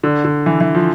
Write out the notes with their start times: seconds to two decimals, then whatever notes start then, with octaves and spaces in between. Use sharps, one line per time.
0.03 D3
0.24 D3
0.46 E3
0.61 E3
0.75 F3